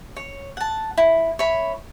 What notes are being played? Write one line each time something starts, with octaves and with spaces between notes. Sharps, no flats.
C#5
F#5 A5
E4
C#5 E5 B5